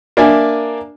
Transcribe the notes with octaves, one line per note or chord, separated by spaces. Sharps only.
A#3 D4 E5 G#5